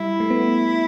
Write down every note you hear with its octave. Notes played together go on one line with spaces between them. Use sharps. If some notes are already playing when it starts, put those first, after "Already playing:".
Already playing: G3 E4
A3
B3